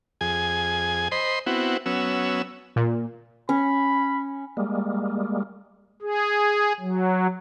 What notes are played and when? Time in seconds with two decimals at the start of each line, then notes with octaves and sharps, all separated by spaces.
0.21 F2 G#4 G#5
1.12 C5 D#5 B5 C6
1.46 B3 C4 E4 F#4
1.86 F#3 B3 C#4 E6
2.76 A#2
3.49 C#4 B5
4.57 G3 G#3 A#3
6.02 G#4
6.80 F#3